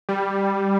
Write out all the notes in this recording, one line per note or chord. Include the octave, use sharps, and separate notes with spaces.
G3